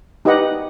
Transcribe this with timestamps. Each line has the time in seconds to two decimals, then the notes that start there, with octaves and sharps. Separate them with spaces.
0.25 D#4 G4 B4 D#5 F#5